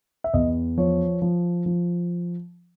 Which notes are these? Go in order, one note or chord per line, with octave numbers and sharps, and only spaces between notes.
E5
E2 D#5
F3 C#5
F3
F3